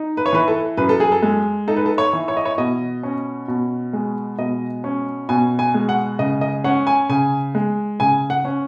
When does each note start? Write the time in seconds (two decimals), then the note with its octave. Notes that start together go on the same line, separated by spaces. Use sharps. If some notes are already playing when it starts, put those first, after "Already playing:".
Already playing: D#4
0.17 B4
0.26 C#5
0.33 E3 B4
0.48 A4
0.77 F#2 B4
0.89 A4
1.00 G#4
1.12 A4
1.22 G#3
1.68 D#4 A4
1.76 B4
1.86 A4
1.98 C#5
2.13 E3
2.28 C#5
2.37 D#5
2.45 C#5
2.58 B2 D#5
3.03 C#4
3.48 B2
3.93 G#3
4.38 B2 D#5
4.84 C#4
5.29 B2 G#5
5.59 G#5
5.74 G#3
5.89 F#5
6.19 C#3 D#5
6.41 D#5
6.64 C#4 F#5
6.87 G#5
7.09 C#3 G#5
7.55 G#3
8.00 C#3 G#5
8.30 F#5
8.45 C#4